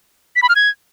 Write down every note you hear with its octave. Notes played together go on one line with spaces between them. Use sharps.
B6
B5
F6
G#6